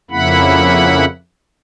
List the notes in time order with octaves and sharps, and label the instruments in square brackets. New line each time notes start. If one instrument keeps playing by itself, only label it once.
[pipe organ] F2 C#3 A#3 E4 F#5 B5